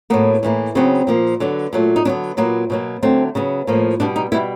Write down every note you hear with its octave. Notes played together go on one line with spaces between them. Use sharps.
A2 F#3 A#3 B3
A2 E3 G3 A#3
C#3 F#3 B3 C4
A#2 F3 A#3
D3 F#3 B3
A#2 F#3 A3
D#4
D3 F#3 B3 D4
A#2 F#3 A#3 B3
B2 F#3 A#3
D3 F#3 A3 C4
C#3 F#3 B3
A2 F3 A#3
B2 G3 B3 D4
D#4
B2 G3 B3 E4